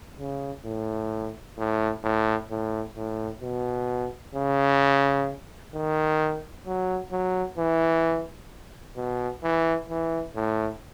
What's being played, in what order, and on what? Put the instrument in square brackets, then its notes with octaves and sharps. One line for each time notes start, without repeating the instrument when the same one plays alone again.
[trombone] C#3
A2
A2
A2
A2
A2
B2
C#3
D#3
F#3
F#3
E3
B2
E3
E3
A2